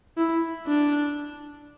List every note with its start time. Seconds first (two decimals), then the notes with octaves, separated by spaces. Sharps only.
0.17 E4
0.67 D4